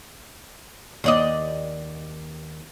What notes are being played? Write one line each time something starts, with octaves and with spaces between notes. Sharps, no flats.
D#2 D5 D#5